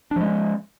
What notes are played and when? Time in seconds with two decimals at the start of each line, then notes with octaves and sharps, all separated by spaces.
0.11 D4
0.16 F3
0.21 G#3
0.26 C#4